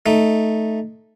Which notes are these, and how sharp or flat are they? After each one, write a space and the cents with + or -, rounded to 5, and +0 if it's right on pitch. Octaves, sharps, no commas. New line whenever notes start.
A3 +0 D#4 +0